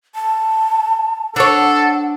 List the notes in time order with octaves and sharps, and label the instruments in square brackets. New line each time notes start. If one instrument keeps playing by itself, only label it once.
[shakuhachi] A5
[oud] D4 C#5 [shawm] A4 [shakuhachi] F#5